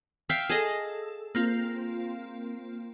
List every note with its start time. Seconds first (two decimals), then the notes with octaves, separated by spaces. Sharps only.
0.29 E5 F5 G5
0.50 G#4 A4 D#5
1.35 A#3 C4 F4